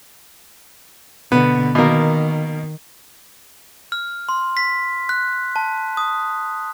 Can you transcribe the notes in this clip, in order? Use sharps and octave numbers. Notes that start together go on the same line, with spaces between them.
B2 D3 B3
B2 D#3 A#3
F6
C6
B6
F#6
A5
D#6